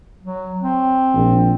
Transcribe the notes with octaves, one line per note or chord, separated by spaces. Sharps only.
F#3
C4
A#1